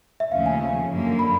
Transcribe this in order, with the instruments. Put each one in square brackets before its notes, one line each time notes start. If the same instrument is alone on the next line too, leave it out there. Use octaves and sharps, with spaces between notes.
[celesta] E5
[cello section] D#2 C#3 F3 A3 C#4 [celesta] F5
[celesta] G#5
[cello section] F#2 D3 F#3 A#3
[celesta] B5